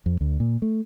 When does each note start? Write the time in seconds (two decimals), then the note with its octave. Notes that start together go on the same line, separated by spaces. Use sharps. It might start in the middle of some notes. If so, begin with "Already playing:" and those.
0.06 F2
0.21 D2
0.40 A#2
0.62 A3